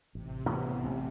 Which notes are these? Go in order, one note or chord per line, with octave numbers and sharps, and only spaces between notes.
A1 C3
A2 E3 B3
A1